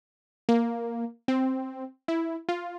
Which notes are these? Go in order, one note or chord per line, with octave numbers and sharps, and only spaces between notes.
A#3
C4
E4
F4